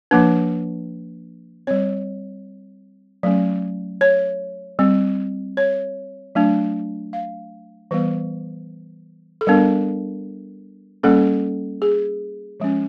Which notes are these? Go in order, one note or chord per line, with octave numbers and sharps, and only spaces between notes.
F3 A#3 D4 B4
G3 C4 C#5
F#3 A3 C#4
C#5
G3 C4
C#5
F#3 A3 D4
F5
E3 G3 B3 B4
A4
G3 B3 D4 A#4
G3 A#3 C#4 A4
G#4
F3 G#3 C#4